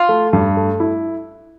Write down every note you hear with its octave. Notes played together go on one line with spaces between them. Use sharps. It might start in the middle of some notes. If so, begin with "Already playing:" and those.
Already playing: F4
A3
G2
A3
E4